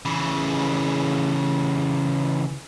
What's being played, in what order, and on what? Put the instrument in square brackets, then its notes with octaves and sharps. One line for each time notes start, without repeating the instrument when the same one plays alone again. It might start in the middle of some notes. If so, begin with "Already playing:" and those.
[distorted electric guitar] C#3 E3